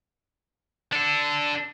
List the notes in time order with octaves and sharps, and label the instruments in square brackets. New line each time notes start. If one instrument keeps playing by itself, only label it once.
[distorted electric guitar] D4 A4